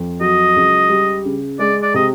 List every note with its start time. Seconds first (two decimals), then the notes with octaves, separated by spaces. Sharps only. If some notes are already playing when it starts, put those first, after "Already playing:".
Already playing: F2
0.21 F#3 D#5
0.56 C#2
0.90 G3
1.25 C#3
1.59 G#3 D5
1.83 D5
1.94 C3 D#5